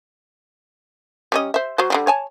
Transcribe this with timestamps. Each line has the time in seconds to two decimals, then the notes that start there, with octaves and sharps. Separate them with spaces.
1.32 G3 C#4 D#5
1.54 C5 E5
1.78 F#3 F#4 C5
1.90 D3 F#3 G3
2.07 C#5 G#5 A5